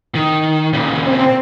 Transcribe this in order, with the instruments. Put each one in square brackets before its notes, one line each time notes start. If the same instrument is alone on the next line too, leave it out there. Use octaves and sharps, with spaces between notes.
[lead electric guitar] D#3
A#2 C#3
[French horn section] C4